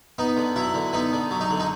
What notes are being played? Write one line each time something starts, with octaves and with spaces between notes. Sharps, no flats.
B3 D#4
D3
F#3 E4
D3
B3 D#4
D3
F#3
D#4
D3
D#4